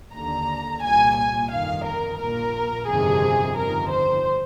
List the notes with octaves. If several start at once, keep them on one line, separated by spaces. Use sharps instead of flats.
D#2 D3 A#5
C2 A#2 G#5
G#5
G1 F2 D#3 F5
A#4
A#1 A#2 A#4
G1 F2 C3 D#3 G#4
G1 F2 D#3 A#4
C5